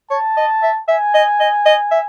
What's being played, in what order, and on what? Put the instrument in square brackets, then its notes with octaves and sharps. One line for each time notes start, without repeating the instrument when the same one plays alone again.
[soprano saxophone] C#5 [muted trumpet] A5
[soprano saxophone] D#5
E5
[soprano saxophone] E5 [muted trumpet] G#5
[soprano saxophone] D#5
D#5
D#5
E5